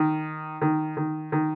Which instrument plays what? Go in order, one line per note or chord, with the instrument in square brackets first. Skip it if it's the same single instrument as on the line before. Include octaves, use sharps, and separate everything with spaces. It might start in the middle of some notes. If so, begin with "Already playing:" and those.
Already playing: [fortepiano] D#3
D#3
D#3
D#3